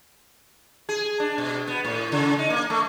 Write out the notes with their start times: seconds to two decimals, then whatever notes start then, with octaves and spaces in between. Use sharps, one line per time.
0.89 G#4
1.20 D4
1.38 B2
1.67 B3
1.85 A2
2.12 C#3
2.39 D#4
2.50 A#3
2.70 A3